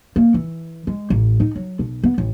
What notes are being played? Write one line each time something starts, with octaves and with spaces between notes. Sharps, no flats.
A#3
E3
G#3
A1
D#4
F#3
B1
B3
A1